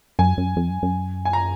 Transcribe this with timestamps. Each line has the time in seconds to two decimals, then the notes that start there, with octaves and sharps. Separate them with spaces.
0.19 F#2 G#5
0.38 F#2
0.56 F2
0.70 F#2
0.83 F#2
1.25 G#5
1.33 A#5